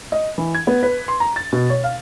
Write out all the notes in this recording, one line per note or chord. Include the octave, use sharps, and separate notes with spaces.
D#5
E3
G#6
B3
B4
C6
A#5
A6
B2
C#5
F5